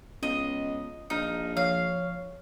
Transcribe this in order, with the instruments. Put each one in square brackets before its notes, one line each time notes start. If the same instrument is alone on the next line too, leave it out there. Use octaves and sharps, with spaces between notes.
[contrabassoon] C#2 [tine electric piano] B3 [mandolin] D#5
[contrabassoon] A#1 [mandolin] D#4 [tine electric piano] D#6 F6
[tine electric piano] F3 [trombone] C#5 [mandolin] F5